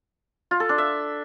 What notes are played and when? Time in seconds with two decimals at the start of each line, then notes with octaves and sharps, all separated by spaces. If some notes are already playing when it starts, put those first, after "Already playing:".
0.51 F4
0.60 A4
0.69 D4
0.78 E5